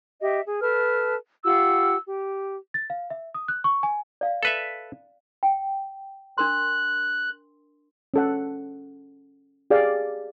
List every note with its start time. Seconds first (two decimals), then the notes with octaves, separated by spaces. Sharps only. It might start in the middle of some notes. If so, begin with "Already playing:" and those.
0.22 G4 D#5 E5
0.46 G#4
0.62 A4 B4 A5 F6
1.45 F4 G4 F#5 E6
2.05 G4
2.74 A6
2.90 F5
3.10 E5
3.34 D#6
3.48 F#6
3.64 C#6
3.83 G#5
4.21 D5 F5
4.43 A4 B4 E5
5.43 G5
6.38 D4 A#4 C6 F#6
8.14 C#4 A4 F#5
9.70 G4 G#4 D5 F5